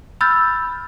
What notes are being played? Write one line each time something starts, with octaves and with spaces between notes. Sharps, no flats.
B5 E6 F6 G6 A6